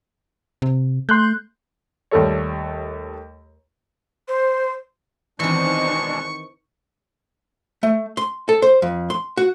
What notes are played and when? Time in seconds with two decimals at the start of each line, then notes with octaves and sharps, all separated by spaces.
0.62 C3
1.09 A3 C6 F#6 G6
2.11 D#2 G3 A3 A4 C#5
4.28 C5
5.40 B2 D#3 E3 G#3 C4 D4 D#4 C#6
7.83 A3
8.17 C6
8.49 A4
8.62 C5
8.82 F2
9.10 C6
9.37 F#4